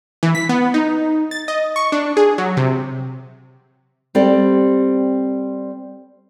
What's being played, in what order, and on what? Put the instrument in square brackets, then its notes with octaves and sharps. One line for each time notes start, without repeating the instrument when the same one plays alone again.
[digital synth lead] E3
B6
B3
D#4
A6
D#5
C#6
D4
G#4
F#3
C3
[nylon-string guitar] G3 C4 G4 A4 D5